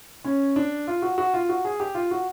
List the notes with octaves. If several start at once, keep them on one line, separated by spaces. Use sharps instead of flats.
C#4
D4
F4
F#4
F#4
F4
F#4
G#4
G4
F4
F#4